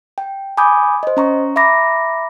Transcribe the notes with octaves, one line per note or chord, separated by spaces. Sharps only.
G5
G#5 B5 D6 D#6 G6
C5 D#5
C#4 A#5 C#6
E5 A#5 B5 D6 A#6